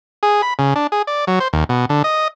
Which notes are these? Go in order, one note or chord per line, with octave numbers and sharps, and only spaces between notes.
G#4
B5
C#3
D4
G#4
D5
F#3
C5
D#2
B2
D3
D#5